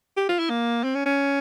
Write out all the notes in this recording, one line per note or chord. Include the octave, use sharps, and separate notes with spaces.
G4
F4
E4
A#3
C4
C#4
C#4